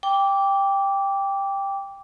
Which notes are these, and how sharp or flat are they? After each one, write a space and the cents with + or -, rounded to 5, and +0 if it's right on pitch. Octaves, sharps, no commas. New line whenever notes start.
G5 +10 D6 -15